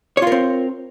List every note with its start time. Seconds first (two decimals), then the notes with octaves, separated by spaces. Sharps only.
0.17 C#5
0.22 F4
0.27 A#4
0.32 C4